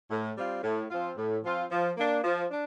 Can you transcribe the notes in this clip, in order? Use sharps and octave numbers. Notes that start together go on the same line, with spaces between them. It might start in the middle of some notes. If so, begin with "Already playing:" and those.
A2
G3 C4 F4
A2
F3 C4 F4
A2
F3 C4 F4
F3
A#3 D4
F3
D4